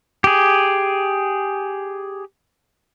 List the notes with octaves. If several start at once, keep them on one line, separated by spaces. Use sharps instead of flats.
G4 G#4